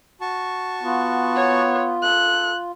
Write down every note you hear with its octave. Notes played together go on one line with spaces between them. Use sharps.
F#4 A5 C#6
B3 F4
C#5
A4 F#6